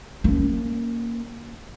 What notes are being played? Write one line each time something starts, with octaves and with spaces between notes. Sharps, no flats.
A#3 C#4